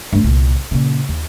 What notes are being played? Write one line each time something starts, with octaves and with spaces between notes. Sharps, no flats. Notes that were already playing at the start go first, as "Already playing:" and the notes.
G2 A3
C2 A#2
A#2 C#3
D#2